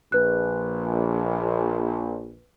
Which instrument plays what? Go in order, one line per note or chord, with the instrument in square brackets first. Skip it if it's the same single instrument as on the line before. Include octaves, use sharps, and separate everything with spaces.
[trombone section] A#1 [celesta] B4 F#6